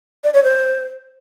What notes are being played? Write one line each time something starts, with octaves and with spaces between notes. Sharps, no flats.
D5
C#5
C5